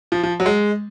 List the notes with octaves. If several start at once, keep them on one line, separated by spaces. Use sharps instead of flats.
F3
F3
F#3
G#3